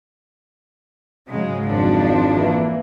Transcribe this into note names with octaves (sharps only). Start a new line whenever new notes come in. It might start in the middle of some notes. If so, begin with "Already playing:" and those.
G#2 C#3 F#3 G#3
G#1 F2 F3 D4
E3 A#3